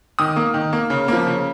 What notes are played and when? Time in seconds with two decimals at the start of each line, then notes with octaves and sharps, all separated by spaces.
0.19 D#3 D#6
0.36 A#3
0.54 D#3
0.73 A#3
0.90 C#3
1.08 F3 A#3
1.27 C#3